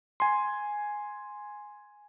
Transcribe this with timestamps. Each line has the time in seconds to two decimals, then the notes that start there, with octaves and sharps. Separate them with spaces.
0.20 G#5 C6